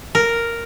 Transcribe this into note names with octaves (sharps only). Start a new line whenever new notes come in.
A#4